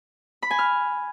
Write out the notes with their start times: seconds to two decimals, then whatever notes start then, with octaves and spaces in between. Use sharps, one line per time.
0.43 B5
0.51 G#5
0.59 F6